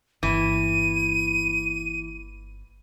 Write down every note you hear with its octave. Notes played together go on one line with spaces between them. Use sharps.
G1 E3 A#3 D#7